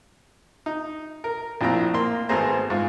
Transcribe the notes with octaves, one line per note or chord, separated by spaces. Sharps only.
D#4
A#4
A#1 A2 C4 A#5
A#3 C6
G#1 A3 B3 G#4 C5 A#5
G#2 F4 G#5